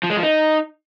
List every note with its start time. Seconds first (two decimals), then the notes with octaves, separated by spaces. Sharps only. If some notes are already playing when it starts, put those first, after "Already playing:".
0.03 F3
0.10 G#3
0.16 F3
0.23 D#4